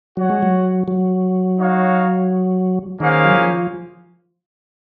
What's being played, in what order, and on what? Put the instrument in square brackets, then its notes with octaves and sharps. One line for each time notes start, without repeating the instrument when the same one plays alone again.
[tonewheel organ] F#3 [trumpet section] F#4 C#5 F#5
[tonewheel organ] G#3
F#3
F#3
[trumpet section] D#4 F#4 C#5 F5
[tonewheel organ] D#3 [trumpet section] A#3 C#4 G#4 C5 F5
[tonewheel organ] F#3
F3